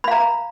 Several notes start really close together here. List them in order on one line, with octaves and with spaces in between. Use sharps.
B5 F5 A#5